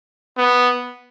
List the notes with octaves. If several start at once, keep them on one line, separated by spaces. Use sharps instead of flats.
B3